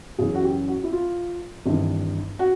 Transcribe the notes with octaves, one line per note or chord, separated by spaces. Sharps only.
F#2 C#3 E3 G#4
F#4
G4
F#4
E4
F4
G#1 G2 E3
F#4